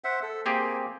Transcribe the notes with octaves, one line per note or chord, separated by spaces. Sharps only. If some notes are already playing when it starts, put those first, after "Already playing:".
C5 E5 F#5
A4
A#3 C4 G4 G#4